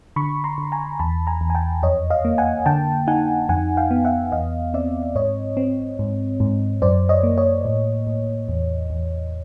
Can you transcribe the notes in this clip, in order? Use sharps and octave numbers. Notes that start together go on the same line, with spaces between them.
D3 B5 C#6
A#5 C6
D3
G#5 A#5
E2 A5 B5
G#5 A#5
E2
G#5
G5 A5
F2 C#5 D#5
D#5 F5
A#3
F#5 G#5
D3 G5 A5
D#4 F#5 G#5
F2 F#5 G#5
F5 G5
B3
E5 F#5
E2 D#5 F5
C4 D5 E5
G#2 C#5 D#5
C4
G#2
G#2
F#2 C5 D5
C#5 D#5
A#3
C#5 D#5
A2
A2
E2
E2